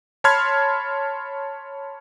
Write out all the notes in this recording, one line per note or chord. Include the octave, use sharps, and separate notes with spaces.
C#5 A5 B5 C6 F6 G#6